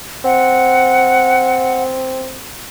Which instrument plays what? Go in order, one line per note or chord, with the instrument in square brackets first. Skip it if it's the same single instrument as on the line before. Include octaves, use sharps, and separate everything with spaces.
[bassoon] C4 [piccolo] F#5